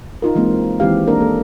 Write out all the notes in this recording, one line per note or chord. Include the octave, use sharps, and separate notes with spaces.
D#4 F4 A#4
E3 G#3 A#3 C4
D#3 E3 G#3 C4 G4 F5
A#3 D4 A#4
A#3 A4